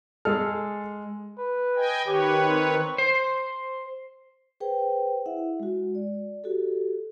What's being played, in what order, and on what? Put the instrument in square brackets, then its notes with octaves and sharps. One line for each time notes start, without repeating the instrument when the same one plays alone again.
[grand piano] G#3 F6 [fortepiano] G#4 A4
[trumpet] B4
[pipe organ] D#5 G5 G#5
[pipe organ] D#3 B4 C#5 [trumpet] G4
[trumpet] C4
[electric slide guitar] C5
[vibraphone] G#4 B4 C5 G5
E4 E5 F#5
G#3 F#4
D5
F#4 G4 A4